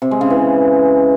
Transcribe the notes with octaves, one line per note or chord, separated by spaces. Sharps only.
C3
G#3
C#3
E3